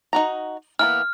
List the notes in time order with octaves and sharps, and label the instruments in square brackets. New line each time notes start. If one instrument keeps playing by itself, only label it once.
[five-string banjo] D#4 F#4 A#5
[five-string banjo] E3 A#3 B3 [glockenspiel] F6